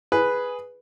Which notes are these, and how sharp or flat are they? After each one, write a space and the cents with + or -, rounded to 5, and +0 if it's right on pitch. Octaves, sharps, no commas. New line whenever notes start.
G#4 +0 B4 +0